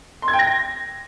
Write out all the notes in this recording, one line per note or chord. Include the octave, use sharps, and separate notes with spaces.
C6
G#6
G5
A#6